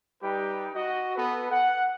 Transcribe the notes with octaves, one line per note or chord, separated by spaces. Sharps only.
G3 D#4 G4 B4
F#4 D#5
B3 A4 B4
F#5